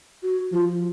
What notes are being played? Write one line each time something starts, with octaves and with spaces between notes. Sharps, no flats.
F#4
F3 F4